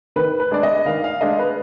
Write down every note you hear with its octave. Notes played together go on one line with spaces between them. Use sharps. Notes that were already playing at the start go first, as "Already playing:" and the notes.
D#3 B4
B4
G#3 D4 D5
D#5
D#3 F5
F5
G#3 D4 D#5
B4